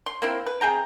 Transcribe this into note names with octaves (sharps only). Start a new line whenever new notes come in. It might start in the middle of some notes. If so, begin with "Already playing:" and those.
C6
A#3 C4 E4
B4
C3 G#4 G5 A#5